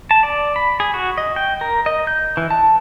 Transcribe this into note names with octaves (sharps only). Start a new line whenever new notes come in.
A5
D5
B5
G#4
F#4
D#5
G5
A#4
D#5
G6
E3
A5